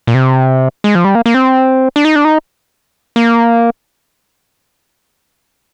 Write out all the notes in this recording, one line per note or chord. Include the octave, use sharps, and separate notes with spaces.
A#2
C3
G#3
F3
G3
A#3
A#3
C4
D4
D#4
D4
D#4
A#3